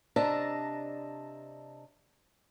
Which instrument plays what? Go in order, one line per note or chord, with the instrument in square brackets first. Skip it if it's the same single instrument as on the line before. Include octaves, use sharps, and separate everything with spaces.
[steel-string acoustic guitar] C3 D4 D#5 E5 A5 A#5